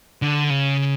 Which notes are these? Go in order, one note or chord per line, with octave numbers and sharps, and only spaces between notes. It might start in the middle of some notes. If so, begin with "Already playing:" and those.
D3
C#3